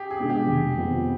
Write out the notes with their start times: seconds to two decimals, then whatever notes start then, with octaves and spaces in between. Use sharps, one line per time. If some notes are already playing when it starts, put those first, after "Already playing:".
Already playing: G4 G#4
0.11 G#4
0.20 B2 G#3 B3 D4
0.30 G4
0.47 F1
0.77 F2 D#3 B3 D#4